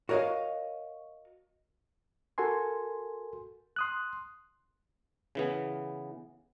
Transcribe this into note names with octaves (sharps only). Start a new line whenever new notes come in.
F#4 A#4 C#5 D#5 F5
F#4 A4 A#4 G#5 C6
C6 D#6 F#6
C#3 E3 B3